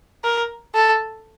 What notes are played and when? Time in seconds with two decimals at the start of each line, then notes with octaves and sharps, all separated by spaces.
0.24 A#4
0.75 A4